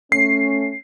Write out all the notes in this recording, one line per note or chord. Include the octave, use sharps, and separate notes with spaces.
A3 C#4 C7